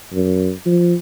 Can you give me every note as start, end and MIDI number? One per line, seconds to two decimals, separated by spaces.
0.13 0.51 42
0.66 0.94 53